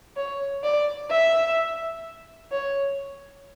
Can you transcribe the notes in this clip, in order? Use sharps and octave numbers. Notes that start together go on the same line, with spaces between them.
C#5
D5
E5
C#5